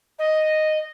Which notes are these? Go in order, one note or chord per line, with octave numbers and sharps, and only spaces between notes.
D#5